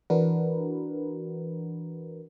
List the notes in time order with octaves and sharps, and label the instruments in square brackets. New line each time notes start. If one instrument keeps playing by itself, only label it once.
[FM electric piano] E3 D4 F#4 A#4 B4